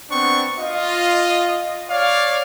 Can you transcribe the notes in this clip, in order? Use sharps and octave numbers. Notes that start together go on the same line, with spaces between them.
B3 C4 D4 C#6
F4 D#5
C#5 D5 F5